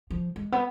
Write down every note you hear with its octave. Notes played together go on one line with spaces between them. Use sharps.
F3
G#3
B3